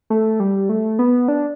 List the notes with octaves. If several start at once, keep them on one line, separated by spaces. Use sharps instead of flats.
A3
G3
A3
B3
D4